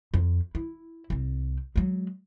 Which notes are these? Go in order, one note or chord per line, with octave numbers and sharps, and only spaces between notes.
F2
E4
C2 C4
F#3 G#3